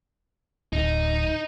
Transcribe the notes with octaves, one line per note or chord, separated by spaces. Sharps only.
D1 D#4